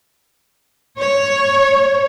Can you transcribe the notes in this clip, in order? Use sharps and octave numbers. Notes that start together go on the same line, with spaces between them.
C#5